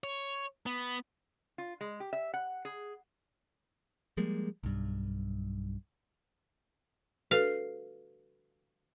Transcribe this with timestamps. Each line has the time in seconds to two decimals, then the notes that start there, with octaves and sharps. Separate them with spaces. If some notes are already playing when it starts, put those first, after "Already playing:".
0.04 C#5
0.66 B3
1.58 F4
1.81 G#3
2.00 G4
2.13 E5
2.34 F#5
2.65 G#4
4.17 F3 G3 G#3 A#3
4.63 B1 G2
7.31 F#4 A4 B4 F5